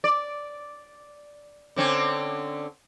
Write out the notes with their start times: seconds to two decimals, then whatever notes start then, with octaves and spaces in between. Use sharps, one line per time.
0.04 D5
1.76 D3 C4 C#4